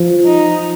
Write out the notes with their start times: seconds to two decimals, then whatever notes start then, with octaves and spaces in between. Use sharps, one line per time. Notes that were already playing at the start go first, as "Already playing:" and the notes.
Already playing: F3
0.25 D#4